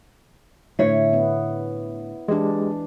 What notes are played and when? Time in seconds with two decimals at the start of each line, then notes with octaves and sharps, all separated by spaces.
0.79 A2 D3 E4 C#5
1.13 B3
2.28 E3 G#3 D4 G4